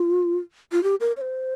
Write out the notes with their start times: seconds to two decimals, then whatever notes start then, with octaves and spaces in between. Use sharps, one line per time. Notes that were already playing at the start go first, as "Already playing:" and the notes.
Already playing: F4
0.72 F4
0.83 G4
1.00 A#4
1.17 C#5
1.21 C5